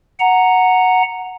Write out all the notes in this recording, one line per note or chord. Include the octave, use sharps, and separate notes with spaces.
F#5 A#5